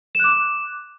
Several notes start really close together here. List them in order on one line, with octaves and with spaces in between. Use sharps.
E7 F#6 D6